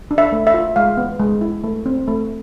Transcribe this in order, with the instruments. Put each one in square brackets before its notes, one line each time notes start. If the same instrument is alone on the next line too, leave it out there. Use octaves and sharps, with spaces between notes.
[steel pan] D4
E5
A3
E5
F4
G#3 F5
B3
G#3
E4
A3
C4
A3